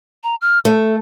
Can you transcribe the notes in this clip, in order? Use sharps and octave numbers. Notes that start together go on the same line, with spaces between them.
A#5
F6
A3 A4